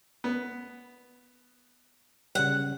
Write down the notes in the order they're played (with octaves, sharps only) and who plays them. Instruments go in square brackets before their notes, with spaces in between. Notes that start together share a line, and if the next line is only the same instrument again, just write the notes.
[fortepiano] B3
[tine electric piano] C#3 G3 [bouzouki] F#5